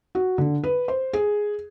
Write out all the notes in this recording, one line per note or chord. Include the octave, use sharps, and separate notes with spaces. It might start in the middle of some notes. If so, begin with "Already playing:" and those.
F#4
D3
B4
C5
G#4